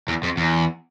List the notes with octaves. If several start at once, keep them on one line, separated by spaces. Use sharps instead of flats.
E2
F2
E2